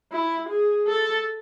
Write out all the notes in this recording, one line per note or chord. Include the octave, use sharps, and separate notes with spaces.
E4
G#4
A4